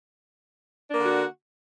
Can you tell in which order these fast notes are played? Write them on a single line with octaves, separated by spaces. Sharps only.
D4 A#3 D3 F#4